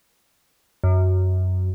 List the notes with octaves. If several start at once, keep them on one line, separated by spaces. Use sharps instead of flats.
F#2